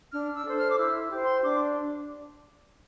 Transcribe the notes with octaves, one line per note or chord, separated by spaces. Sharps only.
D4 F6
E6
A4 C5
F6
D6
E4 E6
G4 C5
C6
D4 D6